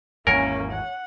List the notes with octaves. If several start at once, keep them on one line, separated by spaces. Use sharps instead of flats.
G#1 E2 A#3 C#4 A#4 C#5 G#5
F#5